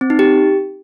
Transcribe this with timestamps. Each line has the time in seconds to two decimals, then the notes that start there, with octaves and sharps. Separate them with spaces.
0.01 C4
0.10 D#4
0.19 G4